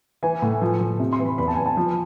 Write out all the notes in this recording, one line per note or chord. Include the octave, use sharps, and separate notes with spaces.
E3 G#5
A2
F3
F3
C3
C6
E3
B5
E2 B5
A5
E2 G#5
A5
F3